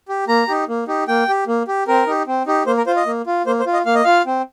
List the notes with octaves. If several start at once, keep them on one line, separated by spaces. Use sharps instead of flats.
G4
A#3 A#5
D#4 G4
A#3
D#4 G4
A#3 G5
G4
A#3
G4
C4 A#4
D#4 G4
C4
D#4 G4
A#3 C5
A#4
F4 C5
D#5
A#3
F4
A#3 C5
C5
F4
D#5
A#3 F5
D#5
F4 F5
C4